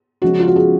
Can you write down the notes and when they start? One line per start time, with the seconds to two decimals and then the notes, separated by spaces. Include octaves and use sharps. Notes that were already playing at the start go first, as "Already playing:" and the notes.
0.22 C#3 F3 G#3 C#4 F#4
0.39 F4
0.48 F#4
0.56 G#4